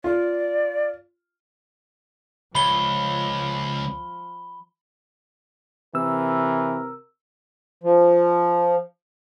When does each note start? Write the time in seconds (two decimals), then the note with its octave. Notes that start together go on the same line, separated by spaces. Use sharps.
0.04 F4 D5
2.55 C#2 F3 B5 G7
5.95 C3 E3 A#4 E6
7.83 F3